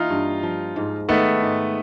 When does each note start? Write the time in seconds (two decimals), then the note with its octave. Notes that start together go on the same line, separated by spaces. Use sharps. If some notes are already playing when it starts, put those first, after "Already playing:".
Already playing: E3 A#3 D#4 F4
0.10 G2
0.43 F3
0.76 G#2
1.09 D#3 A3 B3
1.42 G#2